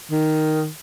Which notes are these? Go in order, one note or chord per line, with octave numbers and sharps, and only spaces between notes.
D#3